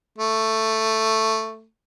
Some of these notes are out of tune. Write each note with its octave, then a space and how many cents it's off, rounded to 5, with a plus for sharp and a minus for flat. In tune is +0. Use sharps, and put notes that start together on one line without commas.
A3 +10